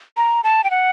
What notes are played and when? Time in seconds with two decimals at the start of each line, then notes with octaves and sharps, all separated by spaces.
0.17 A#5
0.44 A5
0.64 G5
0.71 F#5